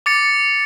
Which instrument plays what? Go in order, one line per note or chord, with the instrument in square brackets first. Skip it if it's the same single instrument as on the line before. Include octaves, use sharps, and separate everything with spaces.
[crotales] D6 A6 C#7